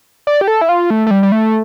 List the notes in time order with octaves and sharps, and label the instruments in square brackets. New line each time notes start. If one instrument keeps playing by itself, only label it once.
[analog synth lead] D5
G4
A4
E4
F4
A3
A3
G3
G3
A3